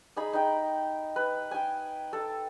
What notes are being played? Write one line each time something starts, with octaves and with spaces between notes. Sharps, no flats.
D#4 G#4 B5
D#4 G5
B4
G5 G#5
A4